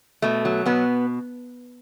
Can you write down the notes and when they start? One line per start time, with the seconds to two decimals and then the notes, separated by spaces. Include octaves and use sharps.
0.22 B2 A3
0.45 F#3
0.66 B2 B3